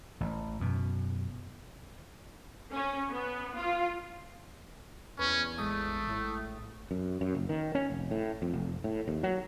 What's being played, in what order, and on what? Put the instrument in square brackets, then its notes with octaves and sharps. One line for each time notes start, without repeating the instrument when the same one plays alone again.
[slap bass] A1
F#2 B2
[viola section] C#4
B3
F4
[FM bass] E2 [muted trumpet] C#4 [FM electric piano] B4
[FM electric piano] A1 G#3 D#6 [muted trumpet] A3
[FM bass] A2
[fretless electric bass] F#2
F#2
F#1
D#3
C#4
F1
A2
F2
F1
A2
D#2
F#3